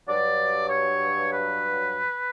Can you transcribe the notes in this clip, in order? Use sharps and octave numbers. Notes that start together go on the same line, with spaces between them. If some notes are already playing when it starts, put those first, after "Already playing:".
G2 F#3 D5
C#5
B4